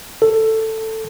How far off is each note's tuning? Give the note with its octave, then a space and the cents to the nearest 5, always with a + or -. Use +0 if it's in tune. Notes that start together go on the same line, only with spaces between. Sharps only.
A4 +10